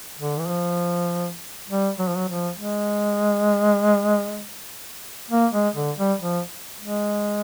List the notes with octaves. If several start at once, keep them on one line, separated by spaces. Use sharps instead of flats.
D3
E3
F3
G3
F#3
F3
F#3
F3
G#3
A#3
G#3
D3
G3
F3
G#3